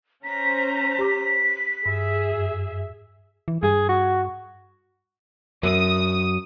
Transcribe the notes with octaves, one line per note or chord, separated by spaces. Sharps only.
C#4 C5 A#5 B6
G4 D6
G2 G#4 E5
F#2
E3
G2 G#4
F#4
F#2 D#6